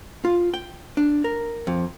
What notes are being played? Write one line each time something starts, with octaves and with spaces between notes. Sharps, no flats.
F4
G5
D4
A#4
F2